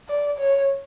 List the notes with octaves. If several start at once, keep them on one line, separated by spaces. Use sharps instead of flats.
D5
C#5